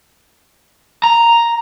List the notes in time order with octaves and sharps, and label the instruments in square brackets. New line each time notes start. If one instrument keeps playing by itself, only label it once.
[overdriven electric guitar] A#5